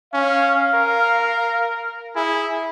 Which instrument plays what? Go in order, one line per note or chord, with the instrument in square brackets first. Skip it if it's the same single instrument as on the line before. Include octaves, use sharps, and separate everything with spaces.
[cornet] C#4 [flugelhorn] F5
[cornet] A#4
[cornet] E4 [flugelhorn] G#4